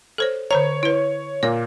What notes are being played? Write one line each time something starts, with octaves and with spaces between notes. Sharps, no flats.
A4 C5 C#5
D3 C5 C#5 A#5
E4 B4
A#2 A#3 C#5